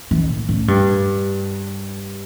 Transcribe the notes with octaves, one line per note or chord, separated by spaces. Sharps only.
E3
A2
A2
G2